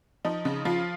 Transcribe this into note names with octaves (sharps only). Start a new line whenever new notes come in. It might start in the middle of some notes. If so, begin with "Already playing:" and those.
F3 D#4
C#3
F3 F4